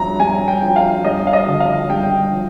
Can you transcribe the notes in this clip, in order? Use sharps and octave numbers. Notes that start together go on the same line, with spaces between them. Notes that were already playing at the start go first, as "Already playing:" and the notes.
Already playing: G2 F3 A#5
G2 G#5
G5
F3
F5
G2 D#5
F5
D#5
D3 F3
F5
G2 G5
F3